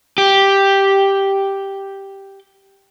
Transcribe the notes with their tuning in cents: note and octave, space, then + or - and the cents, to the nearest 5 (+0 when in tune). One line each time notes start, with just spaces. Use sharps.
G4 +0